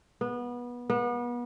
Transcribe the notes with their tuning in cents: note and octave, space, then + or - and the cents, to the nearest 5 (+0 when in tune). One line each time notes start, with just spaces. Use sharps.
B3 -20
B3 -35